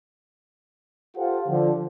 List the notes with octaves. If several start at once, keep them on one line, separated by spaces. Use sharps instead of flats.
F4 G4 A4 C5 F#5
D3 F3